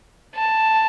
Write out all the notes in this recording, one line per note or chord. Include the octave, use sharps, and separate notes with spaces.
A5